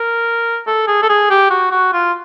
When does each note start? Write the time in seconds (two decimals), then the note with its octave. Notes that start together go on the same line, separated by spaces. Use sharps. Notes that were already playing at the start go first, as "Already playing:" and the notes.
Already playing: A#4
0.67 A4
0.87 G#4
1.02 A4
1.09 G#4
1.30 G4
1.50 F#4
1.71 F#4
1.93 F4